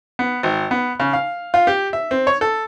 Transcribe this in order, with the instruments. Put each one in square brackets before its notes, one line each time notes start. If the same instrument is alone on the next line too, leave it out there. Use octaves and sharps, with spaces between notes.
[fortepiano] B3
G#1
B3
C#3
F5
F4
G4
E5
C4
C#5
A4